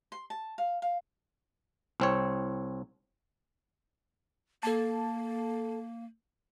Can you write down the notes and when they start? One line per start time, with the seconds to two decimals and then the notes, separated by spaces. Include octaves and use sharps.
0.12 C6
0.30 A5
0.58 F5
0.82 F5
2.00 C2 C4 C#5
4.63 A#3 A4 A5